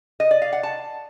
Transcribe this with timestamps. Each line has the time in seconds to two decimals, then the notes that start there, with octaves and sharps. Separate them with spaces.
0.20 D#5
0.31 D5
0.42 F5
0.53 F#5
0.63 A5